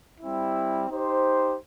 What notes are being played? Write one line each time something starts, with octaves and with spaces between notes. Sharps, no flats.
G3 C4 E4
D#4 G4 C5